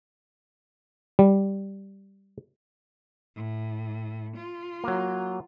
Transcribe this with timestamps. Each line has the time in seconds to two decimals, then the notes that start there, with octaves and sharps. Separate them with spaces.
1.19 G3
3.36 A2
4.37 F4
4.84 F#3 A#3